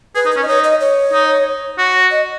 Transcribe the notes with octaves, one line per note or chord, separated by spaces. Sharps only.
G#4 B4
D#4
B4
C#4
D#5
D#4 C#5
D#5
C#5
D#4
F#4
D#5